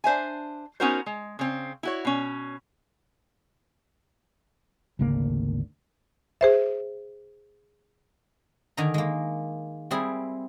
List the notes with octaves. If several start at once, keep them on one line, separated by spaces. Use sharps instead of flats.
D4 C5 E5 G#5
B3 C#4 D#4 F#4 A#4 C5
G#3
C#3 C4
E4 F#4 C#5
B2 C#4
G#1 D2 C#3 A#3
G#4 C5 E5
D3 D#3 G#5 A#5
G#3 A#3
G3 C4 E4 G#4